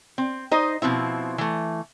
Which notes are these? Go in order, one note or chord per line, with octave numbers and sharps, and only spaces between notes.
C4
D#4 C5 D#5
B2 F3 C4 E4
E3 A3